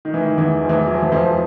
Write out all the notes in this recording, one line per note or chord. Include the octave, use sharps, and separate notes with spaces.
D#3
E3
D#3
E2 E3
F3
E2 E3
F#3
F3
E3
F2 F3
F3